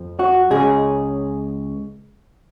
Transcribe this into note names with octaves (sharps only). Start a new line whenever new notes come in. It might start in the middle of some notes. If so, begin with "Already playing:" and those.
Already playing: F2 F3
F#4
C#2 C#3 G#3 G#4